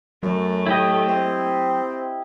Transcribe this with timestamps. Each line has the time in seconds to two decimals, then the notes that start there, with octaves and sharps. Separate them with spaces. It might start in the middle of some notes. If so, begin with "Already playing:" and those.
0.23 F#2 F#3 A3
0.66 A2 E4 G4 D#5
1.08 C4